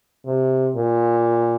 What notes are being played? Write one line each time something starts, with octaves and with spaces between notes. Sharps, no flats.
C3
A#2